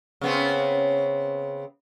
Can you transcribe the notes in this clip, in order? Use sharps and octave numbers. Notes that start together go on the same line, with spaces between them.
C#3 B3 C4